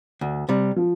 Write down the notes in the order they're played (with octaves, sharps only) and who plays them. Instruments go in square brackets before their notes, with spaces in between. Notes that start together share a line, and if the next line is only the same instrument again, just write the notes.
[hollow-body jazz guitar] D2
C3 G3
[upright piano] F3